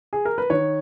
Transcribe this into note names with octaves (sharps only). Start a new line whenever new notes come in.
G#4
A#4
B4
D#3 C#5